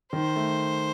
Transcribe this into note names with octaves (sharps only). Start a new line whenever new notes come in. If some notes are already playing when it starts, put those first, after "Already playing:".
D#3 C5
A3